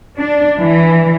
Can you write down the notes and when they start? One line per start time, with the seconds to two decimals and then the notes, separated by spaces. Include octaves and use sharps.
0.18 D4
0.58 E3